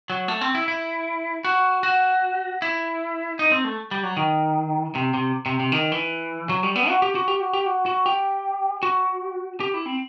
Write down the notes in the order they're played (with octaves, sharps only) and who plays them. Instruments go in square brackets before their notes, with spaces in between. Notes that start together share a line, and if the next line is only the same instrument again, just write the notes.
[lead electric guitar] F#3
A3
C4
E4
E4
F#4
F#4
E4
D#4
C4
A3
G3
F#3
D#3
C3
C3
C3
C3
D#3
E3
F#3
G3
B3
F#4
G4
F#4
G4
F#4
G4
F#4
F#4
G4
F#4
G4
E4
C4